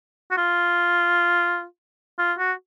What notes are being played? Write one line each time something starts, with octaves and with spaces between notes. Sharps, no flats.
F#4
F4
F4
F#4